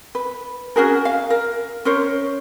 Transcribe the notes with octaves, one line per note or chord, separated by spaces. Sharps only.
B4
C#4 F#4 G#4 A#4
F5
A#4
C#4 A#4 C5 C#5